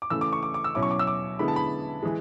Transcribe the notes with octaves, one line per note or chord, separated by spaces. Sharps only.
D6
C#3 E3 A3 E6
D6
C#6
D6
D6
E6
B2 F#3 C#4 E4 D6
C#6
D6
E6
D6
D3 G#3 B3 E4 B5
A5
B5
E3 G#3